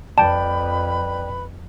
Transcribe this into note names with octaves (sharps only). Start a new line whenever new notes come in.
F2 B4 D5 G5 A5 B5